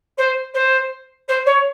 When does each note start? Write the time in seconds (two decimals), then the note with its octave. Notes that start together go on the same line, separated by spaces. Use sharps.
0.17 C5
0.54 C5
1.28 C5
1.46 C#5